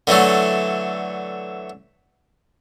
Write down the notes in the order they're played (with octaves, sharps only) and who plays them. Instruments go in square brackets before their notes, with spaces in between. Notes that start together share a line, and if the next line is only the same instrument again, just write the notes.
[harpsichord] D3 E3 F#3 A3